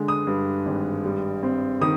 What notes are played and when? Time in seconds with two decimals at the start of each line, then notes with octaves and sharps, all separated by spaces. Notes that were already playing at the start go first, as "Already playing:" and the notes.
Already playing: D3 G#3
0.08 D#6
0.27 G2
0.66 G#1
1.05 G3
1.43 C4
1.81 D#3 D#6